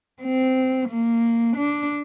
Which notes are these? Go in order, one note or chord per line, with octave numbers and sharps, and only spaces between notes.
C4
A#3
D4